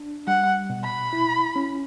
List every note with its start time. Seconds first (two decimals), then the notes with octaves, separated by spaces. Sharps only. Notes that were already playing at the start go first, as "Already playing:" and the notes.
Already playing: D4
0.27 G3 F#5
0.70 B2
0.84 B5
1.13 E4
1.56 C#4